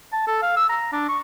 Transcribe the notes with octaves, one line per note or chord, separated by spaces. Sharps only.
A5
A4
F5
E6
A#5
D4
C#6